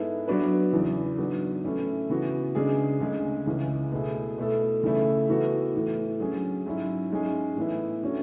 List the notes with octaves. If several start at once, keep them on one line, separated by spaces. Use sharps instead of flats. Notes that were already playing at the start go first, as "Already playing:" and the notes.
Already playing: G#2 G#3 B3 E4 A4
F#3 B3 D4 F#4 B4
E2 C#3 E3
G#2 F#3 B3 D4 F#4
A2 E3 A3 C#4 E4
C#3 E3 B3 F#4
C#3 G#3 D4 G#4
D2 C#3 G#3
C#2 C#3 E3 G#3 C#4
B2 A3 E4 G#4
B2 A3 E4 A4
C#3 E3 A3 E4
E3 B3 F#4 A4
A2 E3 A3
D3 F#3 C#4 G#4
G#2 F#3 C#4 E4
G#2 G#3 C#4 G#4
A2 E3 B3 E4
D3 A3 C#4 F#4 C#5